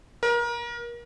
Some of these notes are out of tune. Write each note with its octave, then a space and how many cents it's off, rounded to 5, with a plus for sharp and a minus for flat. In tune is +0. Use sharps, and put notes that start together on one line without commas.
A#4 +30